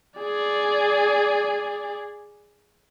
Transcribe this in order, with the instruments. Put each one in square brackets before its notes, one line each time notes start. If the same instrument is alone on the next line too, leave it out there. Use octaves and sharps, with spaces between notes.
[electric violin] G#4 D5